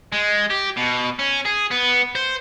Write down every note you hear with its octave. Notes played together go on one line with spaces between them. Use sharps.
G#3
G4
B2
C#4
G#4
B3
C5